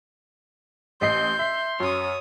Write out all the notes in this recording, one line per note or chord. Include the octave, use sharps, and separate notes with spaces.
A1 D#5 C6 G6 C7
E5 C6
F#2 C#5 D#6